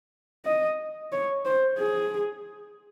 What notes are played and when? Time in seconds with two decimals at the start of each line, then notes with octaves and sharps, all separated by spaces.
0.46 D#5
1.12 C#5
1.45 C5
1.79 G#4